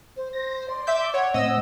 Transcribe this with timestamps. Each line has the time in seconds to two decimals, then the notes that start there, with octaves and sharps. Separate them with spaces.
0.16 C5
0.33 C5 A#6
0.68 D5 C6
0.87 E5 D6 G6
1.14 C#5 F#5
1.34 A2 C4 D#5 E6